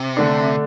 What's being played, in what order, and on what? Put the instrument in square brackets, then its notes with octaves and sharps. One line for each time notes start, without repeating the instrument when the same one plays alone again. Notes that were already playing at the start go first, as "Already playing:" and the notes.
Already playing: [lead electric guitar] C3
[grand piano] D3 A3 D4